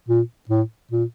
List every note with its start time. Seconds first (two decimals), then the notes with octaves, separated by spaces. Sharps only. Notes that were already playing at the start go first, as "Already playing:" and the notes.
0.09 A#2
0.49 A2
0.91 A#2